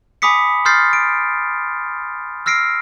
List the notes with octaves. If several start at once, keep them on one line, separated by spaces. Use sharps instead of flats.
G#5 B5 D6 D#6 B6 C#7
C6 D#6 F6 G6 A6 C7
D7
E6 F6 A#6 C7 D7